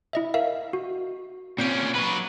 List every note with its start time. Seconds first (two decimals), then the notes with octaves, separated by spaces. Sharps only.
0.13 E4 D#5 E5
0.34 A#4 E5 F5
0.73 F#4
1.58 A#2 C4 C#4 G6 D7
1.95 F#3 B4